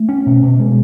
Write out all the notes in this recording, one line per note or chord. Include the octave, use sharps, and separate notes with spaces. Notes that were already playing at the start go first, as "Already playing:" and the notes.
Already playing: A3
C#4
B2
B2
G#3